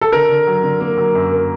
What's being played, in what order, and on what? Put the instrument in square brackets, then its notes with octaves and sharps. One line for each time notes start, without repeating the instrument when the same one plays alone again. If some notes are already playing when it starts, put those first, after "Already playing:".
[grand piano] A4
[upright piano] D3 [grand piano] A#4
[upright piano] D3
F#3
D3
A#3
F#3
F#2
A#3